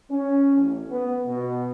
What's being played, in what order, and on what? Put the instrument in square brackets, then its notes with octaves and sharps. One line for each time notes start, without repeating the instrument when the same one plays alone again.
[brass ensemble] C#4
A1
B3
B2